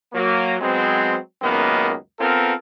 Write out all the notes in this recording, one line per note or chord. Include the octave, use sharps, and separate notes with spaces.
F#3 A#3
F#3 G#3 B3 C4
C#2 F#2 D#3 A#3 B3
B3 C4 F4 A4 A#4